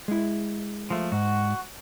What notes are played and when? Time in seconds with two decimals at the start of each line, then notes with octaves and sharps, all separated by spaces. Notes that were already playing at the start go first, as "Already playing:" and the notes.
0.08 G#3 E4
0.90 F3 A3
1.12 G#2 F#4